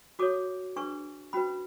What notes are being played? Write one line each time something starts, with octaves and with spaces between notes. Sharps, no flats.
F#4 A4 C#5 D6
D4 G#4 B4 C#6
C#4 F#4 B4 B5